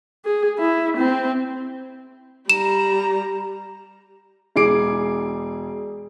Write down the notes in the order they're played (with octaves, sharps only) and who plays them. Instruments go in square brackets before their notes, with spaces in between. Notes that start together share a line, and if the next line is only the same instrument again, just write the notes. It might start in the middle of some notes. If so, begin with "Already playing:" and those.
[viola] G#4
E4
C4
[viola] G3 A#5 [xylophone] E7
[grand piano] E1 E4 G#4 D6 C7 D7